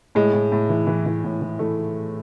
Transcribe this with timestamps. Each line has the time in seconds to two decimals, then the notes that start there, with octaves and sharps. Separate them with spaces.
0.15 A2 G#3
0.33 A2
0.52 A2
0.69 E3
0.87 E3
1.06 E3
1.24 A2
1.41 E3
1.59 E3 A3